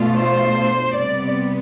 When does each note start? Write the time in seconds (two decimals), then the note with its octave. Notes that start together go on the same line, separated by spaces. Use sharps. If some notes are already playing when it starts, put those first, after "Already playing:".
Already playing: B2 A3 D4 F4
0.17 C5
0.94 C3 G3 B3 D5